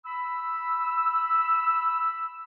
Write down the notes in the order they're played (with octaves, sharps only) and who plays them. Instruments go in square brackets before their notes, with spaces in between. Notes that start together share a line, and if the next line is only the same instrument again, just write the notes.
[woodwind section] B5 E6